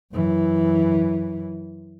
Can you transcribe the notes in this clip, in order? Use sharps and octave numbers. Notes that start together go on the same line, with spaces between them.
F#2 E3